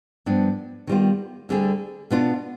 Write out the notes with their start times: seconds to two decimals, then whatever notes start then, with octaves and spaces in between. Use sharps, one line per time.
0.26 G2 F3 B3 D4
0.87 D#3 G3 B3 F4
1.49 D2 D3 G3 D4 G#4
2.10 B2 B3 D4 F4